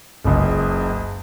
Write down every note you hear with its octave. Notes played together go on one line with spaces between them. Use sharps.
F#1 C#2